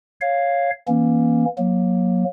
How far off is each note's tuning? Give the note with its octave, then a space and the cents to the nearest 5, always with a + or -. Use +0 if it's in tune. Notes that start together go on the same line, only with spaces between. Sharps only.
C#5 +0 F5 +0
E3 +0 A#3 +20 C#4 -15
F#3 -20 A#3 +20